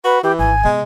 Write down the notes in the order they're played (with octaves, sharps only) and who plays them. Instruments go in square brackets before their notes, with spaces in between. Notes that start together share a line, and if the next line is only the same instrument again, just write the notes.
[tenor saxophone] F#4 [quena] B4
[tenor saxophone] E3 [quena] G4
[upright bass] G#1 [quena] G#5
[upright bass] C3 B3 [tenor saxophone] G#3